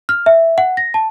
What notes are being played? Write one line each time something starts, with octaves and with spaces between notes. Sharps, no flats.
F6
E5
F#5
A#6
A5